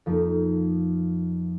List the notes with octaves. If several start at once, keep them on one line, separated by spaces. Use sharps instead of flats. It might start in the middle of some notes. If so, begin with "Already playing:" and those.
F2 F3 A#3 D#4